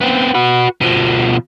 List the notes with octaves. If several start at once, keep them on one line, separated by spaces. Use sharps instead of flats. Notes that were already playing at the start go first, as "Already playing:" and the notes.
B3 C4
F#4 B4
B2 F3